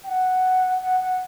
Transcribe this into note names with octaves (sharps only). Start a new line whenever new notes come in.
G5
F#5
F#5
F#5